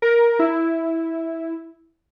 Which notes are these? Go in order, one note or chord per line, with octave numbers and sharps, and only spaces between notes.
A#4
E4